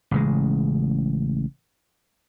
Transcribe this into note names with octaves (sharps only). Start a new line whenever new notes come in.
A1 C#3 G#3